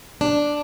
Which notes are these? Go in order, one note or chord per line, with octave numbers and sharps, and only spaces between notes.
D4